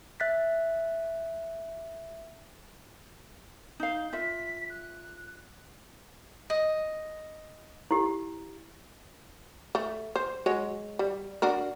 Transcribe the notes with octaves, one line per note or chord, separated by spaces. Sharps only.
E5 F#6 A6 B6
D#4 F5 G6
F4 E5 B6
F#6
D#5
E4 G4
A3
C5
F#3 G#3 C#5
G3
D4 F#4 A#4